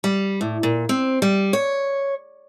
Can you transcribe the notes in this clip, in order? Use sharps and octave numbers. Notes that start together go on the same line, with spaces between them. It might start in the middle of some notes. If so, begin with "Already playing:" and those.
G3
A2
A#2
C4
G3
C#5